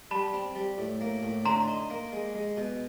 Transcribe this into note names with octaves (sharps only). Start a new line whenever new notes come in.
G3 A5 B5
C4
G3
A2
A#3
A2
D3 A#5 C6
D#4
A#3
G#3
G#3
B2